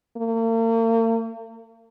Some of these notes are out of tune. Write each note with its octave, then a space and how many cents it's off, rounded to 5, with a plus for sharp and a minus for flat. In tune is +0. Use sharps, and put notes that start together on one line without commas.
A#3 -45